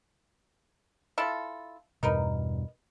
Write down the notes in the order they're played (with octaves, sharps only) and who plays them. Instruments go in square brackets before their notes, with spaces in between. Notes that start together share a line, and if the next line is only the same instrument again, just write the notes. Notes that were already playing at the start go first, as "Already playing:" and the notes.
[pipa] E4 F4 A4
[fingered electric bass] E2 G2 B2 [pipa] D#4 A#4 B4